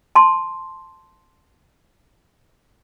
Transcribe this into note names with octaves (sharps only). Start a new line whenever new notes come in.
A5 C6